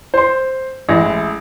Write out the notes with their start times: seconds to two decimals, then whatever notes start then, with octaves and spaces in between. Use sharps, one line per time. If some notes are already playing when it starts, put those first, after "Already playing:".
0.14 C5 C6
0.89 A1 G#3 E4 A#6